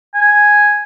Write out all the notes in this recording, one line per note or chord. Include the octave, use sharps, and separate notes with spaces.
G#5